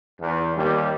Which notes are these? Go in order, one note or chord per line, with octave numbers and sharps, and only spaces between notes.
E2
D#2 G3